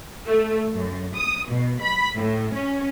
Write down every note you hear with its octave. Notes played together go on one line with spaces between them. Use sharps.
A3
F#2
D#6
B2
B5
A2
C#4